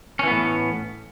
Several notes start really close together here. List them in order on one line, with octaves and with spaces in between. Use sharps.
C#4 E3 B3 A2